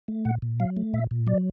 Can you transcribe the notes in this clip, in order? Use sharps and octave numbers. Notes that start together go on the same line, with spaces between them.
A3
A#2 F#5
A#2
F#3 F5
A3
A#2 E5
A#2
F#3 D5